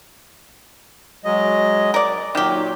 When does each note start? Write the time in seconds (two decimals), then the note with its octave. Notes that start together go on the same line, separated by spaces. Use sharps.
1.25 F#3 G#3 D#5
1.94 A#4 D5
2.35 A#2 D#3 F#3 G4